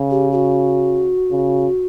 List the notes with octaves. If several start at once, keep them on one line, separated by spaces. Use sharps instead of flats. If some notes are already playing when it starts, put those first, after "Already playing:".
Already playing: C#3
G4
G4
F#4
C#3